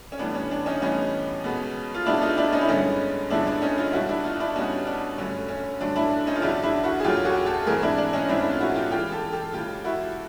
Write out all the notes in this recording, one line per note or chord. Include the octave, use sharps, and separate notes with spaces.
C#4
A2 E3 G3 B3 D4
C#4
D4
C#4 D#4
A2 E3 G3 B3 C#4 D#4
B2 G#3 B3
F4
B2 G#3 B3 D4 E4
D#4 F4
D4 E4
C#4 D#4
E4
G2 D3 F3 G#3 B3 C#4 D#4
G2 D3 F3 G#3 B3 D4 E4
D4
C#4 D#4
D#4 F4
B2 G3 B3 E4 F#4
D4 E4
D#4 F4
D4 E4
B2 G3 B3 C#4 D#4
D4
G2 D3 F#3 A3 C#4
C#4
G2 D3 F#3 A3 D4
D4 E4
C#4 D#4
F4
E2 C#3 F#3 D4 E4
D4 E4
E4 F#4
G#4
E2 C#3 F#3 F4 G4
F#4 G#4
G4 A4
G#2 E3 A3 C4 G#4 A#4
D4 E4
D4
C#4 D#4
G#2 E3 A3 C4 D4 E4
E4
F4
E4 F#4
F4 G4
C#3 E3 G#3 F4 G4
G4 A4
G4 A4
C#3 E3 G#3 F4 G4
E4 F#4